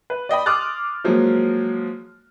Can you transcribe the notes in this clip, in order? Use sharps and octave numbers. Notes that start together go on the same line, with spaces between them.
B4
D5 D#5 G5 B5
C6 D6 D#6 F6 F#6 A6
F3 F#3 G#3 A#3